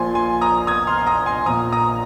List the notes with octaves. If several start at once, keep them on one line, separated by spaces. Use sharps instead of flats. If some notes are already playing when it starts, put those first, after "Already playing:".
Already playing: A#1 A#2 F3 G#5 C6
G#5 C6
A#5 D#6
D#6 G#6
C6 F6
C6
A#5 D#6
G#5 C6
A#1 A#2 F3 A#5 D#6
A#5 D#6